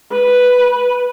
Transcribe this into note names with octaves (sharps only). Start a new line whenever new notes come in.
B4